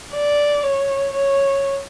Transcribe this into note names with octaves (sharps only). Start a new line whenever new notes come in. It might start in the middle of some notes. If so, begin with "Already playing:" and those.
D5
C#5
C#5